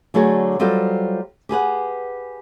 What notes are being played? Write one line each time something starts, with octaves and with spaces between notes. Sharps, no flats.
D3 F#3 A3 G#4 D5 A5
F#3 G3 F4 A4 C5 G5
G4 G#4 B4 F#5